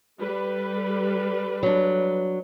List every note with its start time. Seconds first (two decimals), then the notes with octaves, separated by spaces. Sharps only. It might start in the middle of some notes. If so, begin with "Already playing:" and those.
0.20 G3 A4 B4
1.63 F#3 D4